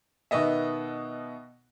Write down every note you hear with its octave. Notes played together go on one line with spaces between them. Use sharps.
B2 D#3 B3 D#5 E5